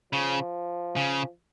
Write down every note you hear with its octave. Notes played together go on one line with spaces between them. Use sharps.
C#3 F3
C#3